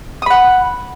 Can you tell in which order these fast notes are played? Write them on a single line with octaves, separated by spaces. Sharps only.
D#6 B5 F#5